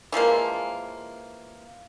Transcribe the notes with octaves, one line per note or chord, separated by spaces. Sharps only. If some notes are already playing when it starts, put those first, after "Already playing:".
E3 F3 G#3 A#3